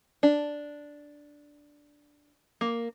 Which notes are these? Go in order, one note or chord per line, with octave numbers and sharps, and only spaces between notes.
D4
A#3